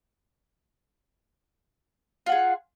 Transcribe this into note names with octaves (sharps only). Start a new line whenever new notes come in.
F4 G#4 F#5